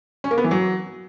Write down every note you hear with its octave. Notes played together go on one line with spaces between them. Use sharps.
C#4
A#3
B3
E3
F#3